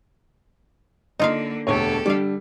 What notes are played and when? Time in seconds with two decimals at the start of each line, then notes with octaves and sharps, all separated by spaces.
1.20 D3 A#3 D#4 F4 F5
1.67 E1 D2 G4 A4 C#5
2.06 D3 G3 D5 F5